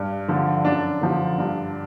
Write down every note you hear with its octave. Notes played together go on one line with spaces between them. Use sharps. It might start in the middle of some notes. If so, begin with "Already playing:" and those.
Already playing: G2
D3 F3
F#2 D4
D3 F3
G2